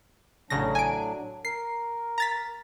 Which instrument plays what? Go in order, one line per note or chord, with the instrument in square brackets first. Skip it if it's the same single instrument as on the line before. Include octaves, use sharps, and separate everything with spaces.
[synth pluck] A1 C#3 A#6 [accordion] A2 F#3 D4
[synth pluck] G#5 D7
[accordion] A#4 [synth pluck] C7
[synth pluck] A#5 A6 B6